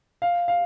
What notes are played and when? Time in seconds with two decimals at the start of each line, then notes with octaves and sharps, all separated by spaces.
0.22 F5
0.48 F5